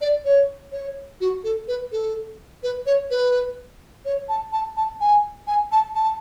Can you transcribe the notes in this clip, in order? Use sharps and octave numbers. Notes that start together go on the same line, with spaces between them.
D5
C#5
C#5
F#4
A4
B4
A4
B4
C#5
B4
C#5
A5
A5
A5
G#5
G#5
A5
A5